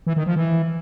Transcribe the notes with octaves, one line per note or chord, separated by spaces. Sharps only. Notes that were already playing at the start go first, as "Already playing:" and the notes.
E3
D#3
F3
E3